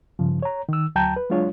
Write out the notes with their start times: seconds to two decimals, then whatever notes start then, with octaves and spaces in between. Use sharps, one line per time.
0.19 G2 C#3 F3
0.42 C#5 A#5
0.69 D#3 E6
0.95 D2 F#3 G5 A5 A#5 G6
1.16 B4
1.30 F#3 G#3 D4 F4 C#5